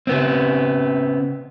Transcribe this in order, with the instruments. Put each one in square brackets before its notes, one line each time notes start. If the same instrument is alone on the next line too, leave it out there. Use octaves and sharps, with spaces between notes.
[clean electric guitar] C#3 B3 C4